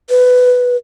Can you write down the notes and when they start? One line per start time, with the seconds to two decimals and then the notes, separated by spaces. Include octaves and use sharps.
0.10 B4